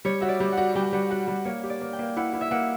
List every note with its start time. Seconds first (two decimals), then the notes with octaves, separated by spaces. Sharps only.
0.05 G3 C#5
0.20 F#4 E5
0.29 D5
0.40 G3
0.52 F#5
0.58 F#4
0.75 G3 G5
0.85 G5
0.93 G3 F#5
1.10 F#4 F#5
1.28 G3 F#5
1.45 A#3 C#5
1.63 G4
1.70 D5
1.81 A#3
1.93 G5
1.99 A#3
2.17 E4 F#5
2.33 E4
2.41 E5
2.51 A#3 F#5